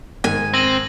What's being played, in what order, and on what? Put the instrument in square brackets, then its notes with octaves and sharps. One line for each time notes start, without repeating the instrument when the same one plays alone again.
[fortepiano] G#2 D#3 [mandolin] G#5
[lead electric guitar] C4 [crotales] A#6 D#7 F#7